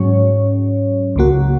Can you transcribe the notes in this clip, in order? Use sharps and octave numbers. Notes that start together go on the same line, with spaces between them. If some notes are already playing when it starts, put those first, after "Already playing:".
Already playing: G#2 F#3 C#4 C#5
C#2 C#3 A#3 F#4